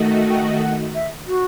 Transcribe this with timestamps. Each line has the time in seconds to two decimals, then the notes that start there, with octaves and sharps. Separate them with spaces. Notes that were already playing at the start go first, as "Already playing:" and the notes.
Already playing: D#3 A3 D#4 F#4
0.29 G5
0.62 F#5
0.95 E5
1.27 F#4